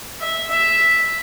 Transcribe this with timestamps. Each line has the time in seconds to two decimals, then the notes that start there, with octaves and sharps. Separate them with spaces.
0.21 E5
0.50 E5